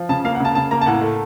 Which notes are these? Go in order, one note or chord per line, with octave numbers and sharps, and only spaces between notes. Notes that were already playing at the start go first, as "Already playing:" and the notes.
Already playing: F3
C#3 A5
A#3 F5
F#5
C#3 A5
C#3 A5
A#3 A#5
A5
A2 F#5
A3